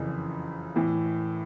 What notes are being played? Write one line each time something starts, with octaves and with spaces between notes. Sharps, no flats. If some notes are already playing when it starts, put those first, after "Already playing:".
Already playing: F#1 F2 C#3 E3
A2 E3